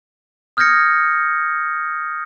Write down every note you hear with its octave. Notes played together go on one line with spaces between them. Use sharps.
D#6 F6 G6 G#6 A#6 C#7